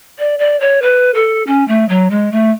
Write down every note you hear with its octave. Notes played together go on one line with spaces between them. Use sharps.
D5
D5
C#5
B4
A4
C#4
A3
F#3
G#3
A3